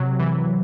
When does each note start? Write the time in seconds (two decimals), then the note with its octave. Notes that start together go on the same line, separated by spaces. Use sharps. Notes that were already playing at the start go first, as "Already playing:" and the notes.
Already playing: C3 F#3
0.20 E3